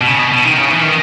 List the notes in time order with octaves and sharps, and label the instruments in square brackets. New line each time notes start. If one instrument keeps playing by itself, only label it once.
[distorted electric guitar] B2
C#3
B2
B2
D#3
C#3
E3
D#3